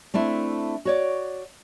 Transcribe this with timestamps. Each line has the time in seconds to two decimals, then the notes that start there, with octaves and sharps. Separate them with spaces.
0.14 A3 C4 D4 E4
0.85 F#4 C#5 D5